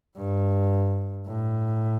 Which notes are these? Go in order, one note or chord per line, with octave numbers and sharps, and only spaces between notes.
G2
A2